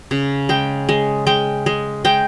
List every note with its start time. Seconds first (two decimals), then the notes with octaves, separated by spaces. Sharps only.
0.11 C#3
0.49 G#3 G5
0.89 G#3
1.27 G#3 G5
1.66 G#3
2.05 G#3 G5